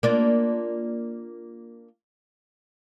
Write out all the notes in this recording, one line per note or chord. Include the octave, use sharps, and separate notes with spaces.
A#3 D4 F4